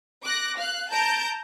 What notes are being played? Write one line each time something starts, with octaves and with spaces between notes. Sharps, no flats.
D6 F#6 A#6
F5 F#6
A5 A#5 G6 D7